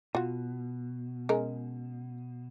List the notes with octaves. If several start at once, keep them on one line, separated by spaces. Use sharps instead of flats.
B2 F4 F#4
G#3 C#4 A#4